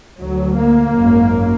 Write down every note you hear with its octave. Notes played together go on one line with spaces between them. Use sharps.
D2 F#3
A#3
G#1 F#2